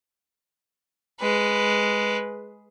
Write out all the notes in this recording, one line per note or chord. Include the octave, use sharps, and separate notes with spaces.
G#3 B4